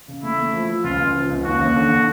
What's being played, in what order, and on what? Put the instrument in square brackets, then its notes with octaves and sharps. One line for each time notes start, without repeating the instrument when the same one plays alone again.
[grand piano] C#3
[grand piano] A3 [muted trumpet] E4
[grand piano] A3
F3
F3
[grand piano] C#2 [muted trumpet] F4
[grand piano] C#2
F3
C#2
[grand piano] D#2 [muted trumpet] F#4
[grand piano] D#2
D3
D3